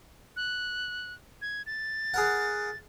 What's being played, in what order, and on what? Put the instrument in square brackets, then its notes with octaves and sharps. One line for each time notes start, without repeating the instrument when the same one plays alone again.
[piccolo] F#6
G#6
A6
[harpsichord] G#4 A#4 F#5